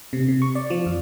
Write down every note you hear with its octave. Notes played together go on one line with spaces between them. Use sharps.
C3
C3
C#6
D5
F3
F2